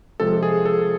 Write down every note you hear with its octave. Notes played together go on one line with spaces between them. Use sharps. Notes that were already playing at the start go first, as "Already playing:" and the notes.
C3 F3 G#3 A4
G#4
A4